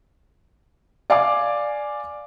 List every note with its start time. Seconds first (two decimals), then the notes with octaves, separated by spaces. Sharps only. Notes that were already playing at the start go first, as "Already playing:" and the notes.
1.10 D5 F5 G#5 D6